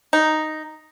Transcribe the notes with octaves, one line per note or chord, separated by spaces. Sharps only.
D#4